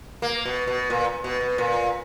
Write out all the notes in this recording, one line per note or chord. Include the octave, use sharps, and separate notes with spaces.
A#3
B2
B2
A#2
B2
B2
A#2